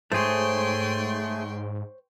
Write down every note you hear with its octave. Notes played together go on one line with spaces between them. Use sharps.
G#2 A3 G#4 C5 C#5 G5 C6 C#6